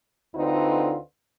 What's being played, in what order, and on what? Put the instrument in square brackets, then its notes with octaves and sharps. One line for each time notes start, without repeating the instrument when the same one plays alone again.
[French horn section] D2 D3 C4 D#4 F4 B4